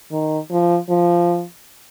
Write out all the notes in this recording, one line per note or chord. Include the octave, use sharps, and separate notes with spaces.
D#3
F3
F3